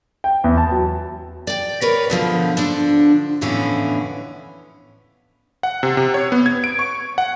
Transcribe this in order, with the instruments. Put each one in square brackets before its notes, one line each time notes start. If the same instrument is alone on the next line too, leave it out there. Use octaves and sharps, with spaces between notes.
[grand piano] G5
E2
A5
F#3
[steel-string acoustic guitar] D5 G5
A#4 B4 C#5
B2 D3 F3
D3 F3 D4
F2 A2 D3 E3 B3 C#4
[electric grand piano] F#5
C3
C3
C#5
B3
G#6
D7
C#6
F#5